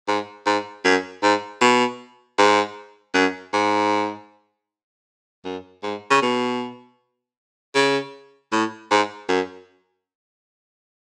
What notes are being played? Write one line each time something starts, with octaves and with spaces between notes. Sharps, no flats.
G#2
G#2
F#2
G#2
B2
G#2
F#2
G#2
F#2
G#2
C#3
B2
C#3
A2
G#2
F#2